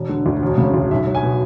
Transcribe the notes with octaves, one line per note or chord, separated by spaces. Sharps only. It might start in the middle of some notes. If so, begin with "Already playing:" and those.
Already playing: E1
D3
D2
E1
C#3
D2
B1 E5
F#3
G#5
B2